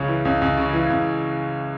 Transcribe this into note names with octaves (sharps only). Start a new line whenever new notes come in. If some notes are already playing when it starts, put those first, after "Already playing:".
Already playing: C#2 C#3 C#4
E3
C#2
C#2
C#3
E3
C#2